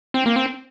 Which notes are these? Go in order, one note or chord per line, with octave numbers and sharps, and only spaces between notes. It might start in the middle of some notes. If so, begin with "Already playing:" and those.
C4
A#3
C4